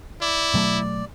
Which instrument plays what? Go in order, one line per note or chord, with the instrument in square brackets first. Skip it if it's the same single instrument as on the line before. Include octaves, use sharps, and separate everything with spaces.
[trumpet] E4 [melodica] D5
[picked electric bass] B2 F#3 A3